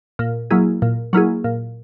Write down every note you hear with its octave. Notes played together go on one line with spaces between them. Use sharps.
A#2
F#3 A#3 E4 G#4
A#2
F#3 A#3 E4 G#4
A#2